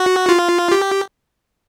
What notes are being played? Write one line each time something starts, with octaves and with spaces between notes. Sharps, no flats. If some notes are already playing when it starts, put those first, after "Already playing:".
Already playing: F#4
F4
G4